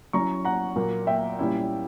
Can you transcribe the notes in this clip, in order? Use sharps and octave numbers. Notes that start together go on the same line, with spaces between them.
F#3 C#4 E4 A#5 C#6
F#5 A#5
A#2 F#3 A#3
E5 G5
A#2 G3 C#4 E4